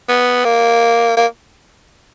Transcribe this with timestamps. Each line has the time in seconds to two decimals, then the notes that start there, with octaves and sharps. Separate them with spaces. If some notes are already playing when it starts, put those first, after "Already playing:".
0.09 B3
0.45 A#3
1.17 A#3